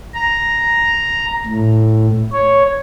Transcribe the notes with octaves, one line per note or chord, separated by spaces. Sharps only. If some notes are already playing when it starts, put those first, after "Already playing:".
A#5
A2
C#5